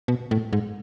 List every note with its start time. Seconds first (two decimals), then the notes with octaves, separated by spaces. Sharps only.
0.08 B2
0.31 A2
0.53 G#2